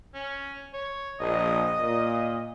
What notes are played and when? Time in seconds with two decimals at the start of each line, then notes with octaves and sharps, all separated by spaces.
0.14 C#4
0.73 C#5
1.20 A#1 D#5
1.80 A#2